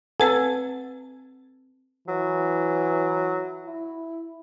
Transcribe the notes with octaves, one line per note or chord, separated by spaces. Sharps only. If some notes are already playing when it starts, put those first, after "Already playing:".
C4 A4 B4 F#5 G#5
E3 F#3
E4